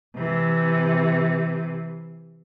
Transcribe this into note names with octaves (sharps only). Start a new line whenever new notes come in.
C3 E3